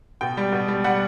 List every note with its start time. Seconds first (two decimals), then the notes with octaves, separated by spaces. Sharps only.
0.21 B2 G5
0.37 G3
0.52 B2
0.68 G3
0.84 G3 F#5